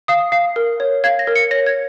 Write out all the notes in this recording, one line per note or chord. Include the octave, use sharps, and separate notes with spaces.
F5 D#6
F5
A#4
C#5
F5 G#6
A#6
A#4
C#7
C#5 A#6
G#6